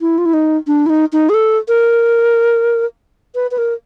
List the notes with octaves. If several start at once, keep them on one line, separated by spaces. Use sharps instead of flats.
E4
F4
E4
D#4
D4
E4
D#4
D#4
G#4
A4
A#4
B4
B4
A#4